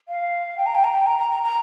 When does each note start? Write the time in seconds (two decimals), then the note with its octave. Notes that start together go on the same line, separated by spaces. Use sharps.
0.09 F5
0.57 G5
0.66 A#5
0.75 G5
0.84 A#5
0.93 G5
1.07 A#5
1.18 A#5
1.31 A#5
1.43 A#5